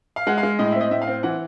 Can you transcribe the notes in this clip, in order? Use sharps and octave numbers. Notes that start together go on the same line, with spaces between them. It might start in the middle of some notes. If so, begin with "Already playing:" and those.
F5
G#3 F#5
F5
G#3
A2 D#5
C4 E5
D#5
A2 E5
F5
C4
E3 F#5